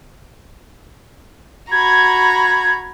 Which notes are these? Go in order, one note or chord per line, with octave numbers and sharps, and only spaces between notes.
F#4 A#5 B5 G#6